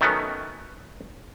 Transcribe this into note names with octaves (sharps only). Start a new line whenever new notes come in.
D#3 F#3 A3 B3 C#4